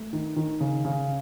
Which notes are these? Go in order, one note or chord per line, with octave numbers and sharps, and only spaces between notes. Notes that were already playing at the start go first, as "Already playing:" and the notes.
Already playing: A3
D#3
D#3
C#3
C#3